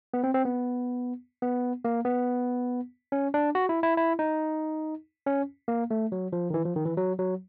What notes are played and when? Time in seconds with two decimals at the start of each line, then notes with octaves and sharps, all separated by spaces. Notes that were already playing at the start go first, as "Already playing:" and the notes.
0.14 B3
0.24 C4
0.34 C4
0.45 B3
1.42 B3
1.85 A#3
2.05 B3
3.12 C#4
3.34 D4
3.55 F#4
3.69 E4
3.83 E4
3.97 E4
4.19 D#4
5.26 C#4
5.68 A#3
5.91 A3
6.12 F#3
6.33 F3
6.50 D#3
6.54 E3
6.65 F3
6.76 D#3
6.85 E3
6.97 F#3
7.19 F#3